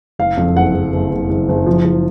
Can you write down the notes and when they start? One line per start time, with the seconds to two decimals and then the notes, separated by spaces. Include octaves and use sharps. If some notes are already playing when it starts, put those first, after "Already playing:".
0.19 F#1 F5
0.37 F2
0.56 F#1 F#5
0.75 F#1
0.93 F#1
1.11 F#1
1.30 F#1
1.49 F#1
1.66 F3
1.85 F#1